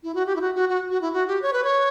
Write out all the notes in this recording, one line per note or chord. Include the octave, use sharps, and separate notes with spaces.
E4
F#4
G4
E4
F#4
F#4
F#4
F#4
E4
F#4
G4
C#5
B4
C#5